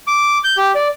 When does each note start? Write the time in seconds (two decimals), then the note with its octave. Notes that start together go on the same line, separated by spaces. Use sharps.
0.07 D6
0.44 G6
0.57 G4
0.75 D5